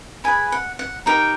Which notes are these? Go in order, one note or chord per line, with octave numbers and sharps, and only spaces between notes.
E4 G#4 B4 G#5
F#5
F#5
D#4 G4 A#4 G5